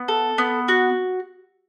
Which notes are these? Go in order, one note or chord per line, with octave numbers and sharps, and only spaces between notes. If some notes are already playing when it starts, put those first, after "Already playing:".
Already playing: B3
A4
B3
F#4